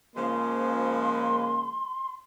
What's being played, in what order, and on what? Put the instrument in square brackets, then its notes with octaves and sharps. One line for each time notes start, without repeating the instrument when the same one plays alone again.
[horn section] C#3 F3 G#3 [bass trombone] A#3 [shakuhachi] C6